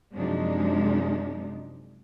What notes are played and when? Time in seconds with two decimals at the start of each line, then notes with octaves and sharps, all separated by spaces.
0.15 F#2 C3 F3 G#3 D4 D#4